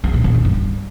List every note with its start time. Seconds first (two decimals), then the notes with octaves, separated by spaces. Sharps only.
0.04 E2
0.14 A#2
0.24 E2
0.34 D3
0.45 G2